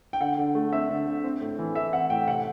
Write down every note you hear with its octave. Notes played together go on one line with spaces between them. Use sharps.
G5
D3 F#5
D3
A3
C4 E5
D3
D3
C4
A2
E3
A3 E5
C4 F#5
A2 G5
C3 F#5